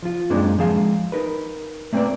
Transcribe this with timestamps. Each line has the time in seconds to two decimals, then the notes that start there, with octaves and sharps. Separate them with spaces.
0.02 F3 F4
0.30 F#2 G#3 A#3 C4 D4 D#4
0.59 F3 G#3 G#4 F5
1.12 D#4 A#4 B4
1.93 A3 A#3 C4 A#4 B4 D5